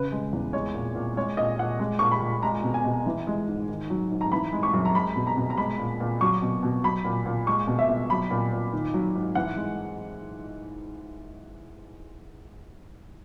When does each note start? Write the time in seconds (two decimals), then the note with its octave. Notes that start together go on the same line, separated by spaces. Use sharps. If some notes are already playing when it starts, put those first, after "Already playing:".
Already playing: C#3 B4
0.12 G#3
0.33 E2
0.53 G#3 C#5
0.74 A#2
0.95 A#2
1.17 G#3 C#5
1.37 A#2 D#5
1.59 A#2 F#5
1.80 G#3
1.99 A#2 C#6
2.11 B5
2.21 A#2
2.43 G#3 A#5
2.63 B2
2.74 G#5
2.84 B2
3.06 E3
3.27 G#3
3.48 G#2
3.68 D#3
3.90 F#3
4.11 G#2
4.21 A#5
4.32 E3 B5
4.53 G#3
4.63 C#6
4.73 F#2
4.85 A#5
4.95 G#3 B5
5.16 B2
5.27 A#5
5.37 B2
5.50 A#5
5.57 G#3 B5
5.79 A#2
6.00 A#2
6.21 F#3 C#6
6.42 B2
6.63 B2
6.84 F#3 B5
7.05 A#2
7.26 A#2
7.47 G#3 C#6
7.67 B2
7.79 E5
7.88 B2
8.10 F#3 B5
8.31 A#2
8.52 A#2
8.73 D#3
8.94 F#3
9.15 G#2
9.35 E3 F#5
9.57 G#3